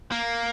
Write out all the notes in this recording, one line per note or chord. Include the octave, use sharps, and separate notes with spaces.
A#3